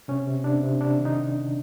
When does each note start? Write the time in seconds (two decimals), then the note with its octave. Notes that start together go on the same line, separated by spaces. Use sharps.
0.08 C3 C#4
0.27 C3
0.44 C3 D4
0.63 C3
0.81 C3 D4
0.98 D#3
1.05 D#4